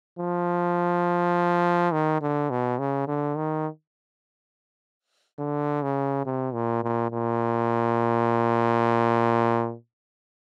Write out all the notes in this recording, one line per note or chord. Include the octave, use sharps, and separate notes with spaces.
F3
D#3
D3
B2
C#3
D3
D#3
D3
C#3
C3
A#2
A#2
A#2